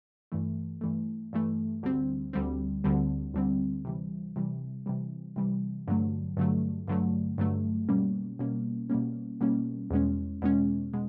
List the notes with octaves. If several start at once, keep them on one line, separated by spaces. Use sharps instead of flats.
G2 E3 A3
G2 E3 A3
G2 E3 A3
D2 D3 G3 C4
D2 D3 G3 C4
D2 D3 G3 C4
D2 D3 G3 C4
C3 E3 G3
C3 E3 G3
C3 E3 G3
C3 E3 G3
G2 D3 F#3 A3
G2 D3 F#3 A3
G2 D3 F#3 A3
G2 D3 F#3 A3
B2 G3 A#3 C#4
B2 G3 A#3 C#4
B2 G3 A#3 C#4
B2 G3 A#3 C#4
E2 B2 G#3 C#4
E2 B2 G#3 C#4
B2 G#3